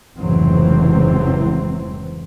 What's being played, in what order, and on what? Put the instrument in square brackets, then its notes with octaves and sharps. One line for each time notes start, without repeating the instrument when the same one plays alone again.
[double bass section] F1 C#2 G#2 E3 F#3 C4